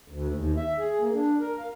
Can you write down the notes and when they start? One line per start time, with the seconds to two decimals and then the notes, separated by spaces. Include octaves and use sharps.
0.08 D2
0.31 D#2
0.57 E5
0.79 G#4
1.00 A#3
1.13 D4
1.41 A#4
1.59 F5